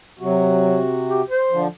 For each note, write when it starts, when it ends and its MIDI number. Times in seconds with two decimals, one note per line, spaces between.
0.19 1.22 48
0.19 0.80 54
0.19 1.22 66
1.10 1.22 67
1.30 1.62 72
1.51 1.67 50
1.51 1.67 53